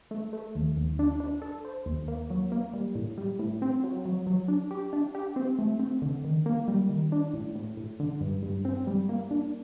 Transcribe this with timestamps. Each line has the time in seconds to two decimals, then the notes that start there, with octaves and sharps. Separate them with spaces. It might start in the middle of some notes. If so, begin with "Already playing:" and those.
0.11 A3
0.33 A3
0.55 D#2
0.77 D#2
0.99 D4
1.20 D4
1.42 A4
1.65 C5
1.86 D#2
2.08 A#3
2.30 F#3
2.52 A#3
2.73 G3
2.95 A2
3.18 G3
3.39 A2
3.62 C4
3.84 F#3
4.05 F#3
4.27 F#3
4.48 D4
4.71 G4
4.93 D4
5.15 G4
5.36 C4
5.59 A3
5.80 C4
6.02 D3
6.24 D#3
6.46 A#3
6.68 G3
6.90 D#3
7.12 D4
7.33 A2
7.55 A2
7.77 A2
8.00 D3
8.21 G2
8.43 G2
8.65 C4
8.87 G3
9.09 A#3
9.31 D4